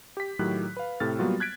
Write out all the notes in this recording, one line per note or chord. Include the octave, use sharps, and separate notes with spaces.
G4 B6
A2 D#3 F#3 G4 F#6
B4 F5
A2 C3 A4 F6 A6
F#3 G3 A#3 B3 F4 F#4
F#6 G#6 B6 D7